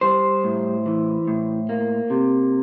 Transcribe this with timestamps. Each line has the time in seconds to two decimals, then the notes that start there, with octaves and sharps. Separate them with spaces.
0.01 G3 C5
0.44 A2
0.86 E3
1.28 A2
1.69 A#3
2.10 C3